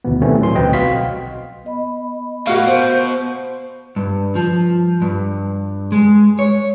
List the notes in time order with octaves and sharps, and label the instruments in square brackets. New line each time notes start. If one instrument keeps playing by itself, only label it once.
[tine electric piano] D2 B2 D#3 E3 B3
D#3 E3 G3 A3 C4 C#4
A2 F#3 C6
D2 B2 C4 B4 D#5 G5
B1 F#4 D#5 F5 C6 B6
[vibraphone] B3 D#5 B5
[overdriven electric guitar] A2 A#3 [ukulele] F#4 F5
[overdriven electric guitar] B2 [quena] C5
[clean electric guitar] G2
F3
G2
G#3
C#5